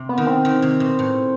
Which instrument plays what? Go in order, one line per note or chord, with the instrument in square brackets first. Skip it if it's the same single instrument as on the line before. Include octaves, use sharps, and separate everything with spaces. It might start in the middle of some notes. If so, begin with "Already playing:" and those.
Already playing: [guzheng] C3
[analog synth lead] B3
[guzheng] D#3
[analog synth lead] C4
[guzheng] D#3
C3
B2
A2